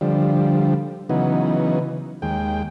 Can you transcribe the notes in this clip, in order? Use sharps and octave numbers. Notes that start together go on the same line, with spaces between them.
D3 F3 G3
C#3 E3 F#3 B3 D#4
D#2 G#3 G5